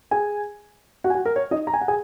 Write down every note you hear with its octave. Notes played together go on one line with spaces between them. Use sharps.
G#4 G#5
F#4 F#5
G#5
F#4 F#5
A#4
C#5
D#4 D#5
A#5
G#5
F#5
G#4 G#5